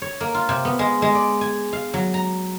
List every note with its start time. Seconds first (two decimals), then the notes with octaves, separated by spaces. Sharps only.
0.02 C#5
0.21 A#3
0.34 F4
0.49 C3
0.65 B3
0.79 G#3
1.02 G#3
1.15 D5
1.41 G#5
1.73 F5
1.94 F#3
2.14 A#5